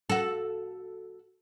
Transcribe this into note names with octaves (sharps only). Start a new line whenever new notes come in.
F#4 A4